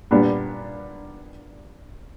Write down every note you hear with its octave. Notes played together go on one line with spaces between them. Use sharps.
A#2 G3 B3 D4